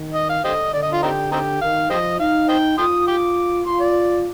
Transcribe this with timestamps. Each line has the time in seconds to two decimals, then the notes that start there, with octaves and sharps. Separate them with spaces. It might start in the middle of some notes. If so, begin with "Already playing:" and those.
Already playing: D#3
0.14 D#5
0.29 F5
0.44 D3 G4 C5 D#5
0.73 D3 D5
0.83 D#5
0.93 F4
1.02 C4 D#4 G4
1.32 C4 D#4 G4
1.61 D#3 F5
1.90 F3 G4 C5 D#5
2.20 D#4 F5
2.49 C5 D#5 G5
2.78 F4 G5 C6 D#6
3.08 G5 D6
3.66 F4 C6
3.80 D5